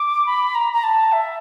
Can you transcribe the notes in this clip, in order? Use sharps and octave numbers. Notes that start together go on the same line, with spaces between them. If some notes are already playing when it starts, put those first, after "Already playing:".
Already playing: D6
B5
A#5
A#5
A5
E5